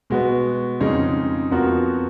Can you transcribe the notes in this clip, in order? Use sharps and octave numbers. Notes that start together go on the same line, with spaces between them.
B2 G#3 B3 F#4 B4
F2 C#3 G#3 D#4 G#4
F2 F3 B3 F#4 A#4